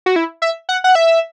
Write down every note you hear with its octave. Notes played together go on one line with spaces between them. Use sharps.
F#4
E4
E5
F#5
F#5
E5